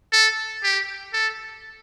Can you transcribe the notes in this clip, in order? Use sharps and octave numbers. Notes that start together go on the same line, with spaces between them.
A4
G4
A4